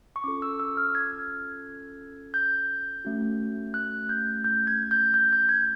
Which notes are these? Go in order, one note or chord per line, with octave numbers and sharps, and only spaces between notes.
C#6
C#4 F4 A4 D6
E6
E6
F6
G#6
G6
A3 C#4 F#4
F#6
G6
G6
G#6
G6
G6
G6
G#6